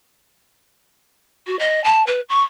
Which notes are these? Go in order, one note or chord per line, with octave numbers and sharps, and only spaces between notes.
F#4
D#5
A5
B4
C#6